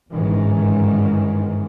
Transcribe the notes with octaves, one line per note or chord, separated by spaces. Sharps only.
G1 G#2 D#3 E3 C#4